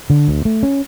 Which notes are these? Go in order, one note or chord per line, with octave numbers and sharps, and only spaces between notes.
D3
D2
A3
C#4